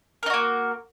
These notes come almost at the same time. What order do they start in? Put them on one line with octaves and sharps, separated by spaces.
A#4 D#4 F#4 A#3